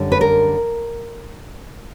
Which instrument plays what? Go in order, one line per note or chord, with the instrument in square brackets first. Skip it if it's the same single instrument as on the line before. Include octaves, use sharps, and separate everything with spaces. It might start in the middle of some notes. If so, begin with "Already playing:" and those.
Already playing: [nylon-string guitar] F#2 D3 G3
B4
A#4